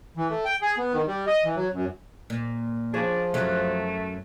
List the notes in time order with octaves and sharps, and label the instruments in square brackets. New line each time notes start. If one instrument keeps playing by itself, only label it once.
[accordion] E3
A3
G5
G#4
B3
D#3
G3
D#5
E3
F#3
F#2
[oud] A#2
[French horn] F3 [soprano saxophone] D4 [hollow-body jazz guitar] G#4 C#5
[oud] F#2 F#3 [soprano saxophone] A3